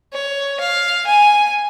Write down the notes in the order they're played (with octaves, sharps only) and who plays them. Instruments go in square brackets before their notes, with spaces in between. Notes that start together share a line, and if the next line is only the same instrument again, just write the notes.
[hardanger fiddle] C#5
F5
G#5